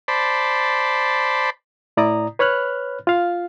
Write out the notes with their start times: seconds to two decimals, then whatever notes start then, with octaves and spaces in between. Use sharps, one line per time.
0.08 C5 D5 A5 B5
1.97 A2 E4 D5 A#5 D#6
2.39 B4 C#5 B5 F6 F#6
3.07 F4 F5